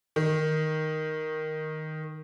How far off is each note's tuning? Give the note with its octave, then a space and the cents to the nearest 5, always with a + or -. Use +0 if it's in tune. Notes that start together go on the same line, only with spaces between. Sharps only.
D#3 +0